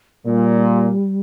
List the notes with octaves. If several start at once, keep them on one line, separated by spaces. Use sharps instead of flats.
A#2 G3